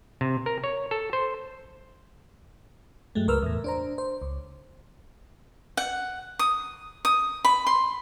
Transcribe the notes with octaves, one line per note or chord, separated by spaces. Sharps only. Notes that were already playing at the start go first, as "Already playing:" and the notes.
C3
A#4
C#5
A4
C5
G2 F#3 G#3 A3
C#2 A#4 B4 E6 F6
E2 A2
D4 C5 A#5
C5
C#2
F#5
D#6
D#6
B5
C6